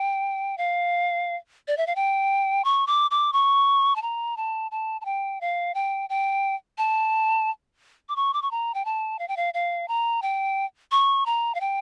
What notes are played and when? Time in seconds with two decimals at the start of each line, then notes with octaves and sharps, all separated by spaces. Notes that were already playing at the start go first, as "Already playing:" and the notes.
Already playing: G5
0.58 F5
1.68 D5
1.77 E5
1.87 F5
1.96 G5
2.65 C#6
2.87 D6
3.11 D6
3.33 C#6
3.96 A5
4.02 A#5
4.37 A5
4.71 A5
5.01 A5
5.05 G5
5.41 F5
5.74 G5
6.10 G5
6.78 A5
8.09 D6
8.16 C#6
8.33 D6
8.42 C#6
8.51 A#5
8.74 G5
8.85 A5
9.19 F5
9.28 G5
9.37 F5
9.54 F5
9.88 A#5
10.22 G5
10.91 C#6
11.26 A#5
11.55 F5
11.61 G5